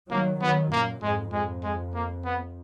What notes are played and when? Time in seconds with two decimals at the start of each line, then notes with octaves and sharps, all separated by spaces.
0.10 D#3 F#3 A#3
0.41 D#3 F#3 B3
0.72 F#2 A#2 A#3
1.02 F2 G#2 G#3
1.33 F2 G#3
1.64 G#3
1.94 A#3
2.25 B3